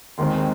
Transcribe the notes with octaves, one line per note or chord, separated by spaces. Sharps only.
D#2 D#3 G#3 C4 C6